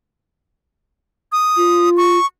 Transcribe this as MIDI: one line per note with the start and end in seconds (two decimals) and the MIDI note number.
1.32 1.90 87
1.57 2.19 65
1.97 2.26 85